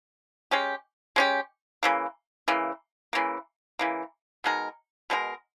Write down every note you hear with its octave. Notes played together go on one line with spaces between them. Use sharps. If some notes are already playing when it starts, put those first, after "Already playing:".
G#3 C#4 G4
G#3 C#4 G4
C#3 E3 A#3
C#3 E3 A#3
C#3 E3 A#3
C#3 E3 A#3
B2 G#3 D#4 A#4
B2 G#3 D#4 A#4